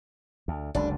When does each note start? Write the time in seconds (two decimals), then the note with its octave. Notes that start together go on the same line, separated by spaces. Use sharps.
0.48 D2
0.75 F#1 C#2 D3 D4